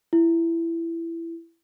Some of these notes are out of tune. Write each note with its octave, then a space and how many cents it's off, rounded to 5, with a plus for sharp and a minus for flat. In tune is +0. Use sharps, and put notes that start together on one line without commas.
E4 +15